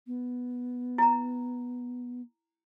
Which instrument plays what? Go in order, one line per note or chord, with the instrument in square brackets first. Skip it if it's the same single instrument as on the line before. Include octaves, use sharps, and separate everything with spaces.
[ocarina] B3
[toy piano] E4 A#5